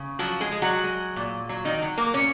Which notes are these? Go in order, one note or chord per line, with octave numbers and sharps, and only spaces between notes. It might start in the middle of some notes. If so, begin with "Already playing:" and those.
Already playing: C#3
F3 F#3 F#4
G#3 G#4
G#3
F#3 F#4
G#3
A#2
F#3
D#3 D#4
F#3
A#3 A#4
A#2 C#4 C#5